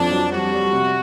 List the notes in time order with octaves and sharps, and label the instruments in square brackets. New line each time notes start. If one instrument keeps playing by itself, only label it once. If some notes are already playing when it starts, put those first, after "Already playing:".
Already playing: [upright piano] F2 [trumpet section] D4
[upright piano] F#3
[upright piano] G3 [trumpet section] F#4
[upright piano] G3
C3